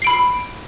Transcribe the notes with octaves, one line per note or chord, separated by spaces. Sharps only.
B5 C7 D7